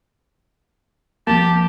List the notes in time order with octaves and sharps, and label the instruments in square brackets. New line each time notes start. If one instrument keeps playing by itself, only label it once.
[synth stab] C2 A#3 [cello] F3 [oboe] G4 [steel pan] A5